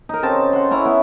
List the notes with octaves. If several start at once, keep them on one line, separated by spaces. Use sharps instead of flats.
D#4 A#4
C#3 C4 A5
F#5 C6
C#4 E4 A#5
B3 E4